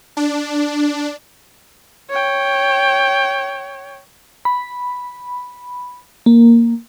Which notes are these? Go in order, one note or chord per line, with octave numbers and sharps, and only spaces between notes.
D4
C#5 G5
B5
A#3